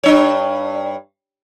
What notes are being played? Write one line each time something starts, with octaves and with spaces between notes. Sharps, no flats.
G2 D4 C#5